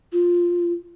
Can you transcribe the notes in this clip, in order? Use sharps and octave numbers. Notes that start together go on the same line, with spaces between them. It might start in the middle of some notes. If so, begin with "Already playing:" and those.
F4